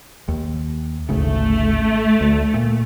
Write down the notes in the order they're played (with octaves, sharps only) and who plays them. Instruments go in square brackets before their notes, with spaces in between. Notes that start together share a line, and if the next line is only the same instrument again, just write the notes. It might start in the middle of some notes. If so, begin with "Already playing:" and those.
[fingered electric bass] D#2
[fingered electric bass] G#1 D2 C#3 [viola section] A3
[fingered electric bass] D2
A#2